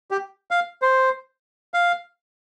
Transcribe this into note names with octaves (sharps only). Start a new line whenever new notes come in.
G4
F5
C5
F5